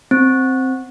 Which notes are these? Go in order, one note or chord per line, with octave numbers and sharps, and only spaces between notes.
C4